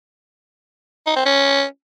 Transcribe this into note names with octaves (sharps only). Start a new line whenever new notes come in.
D#4
C4
C#4